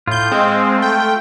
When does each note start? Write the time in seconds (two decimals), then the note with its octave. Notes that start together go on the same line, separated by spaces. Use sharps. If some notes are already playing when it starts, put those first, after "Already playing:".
0.08 A2 F4 G6
0.32 G#3 C4
0.78 A3 G5